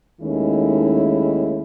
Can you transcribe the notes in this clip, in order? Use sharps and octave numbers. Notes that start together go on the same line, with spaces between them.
D#2 D#3 G#3 A3 C#4 E4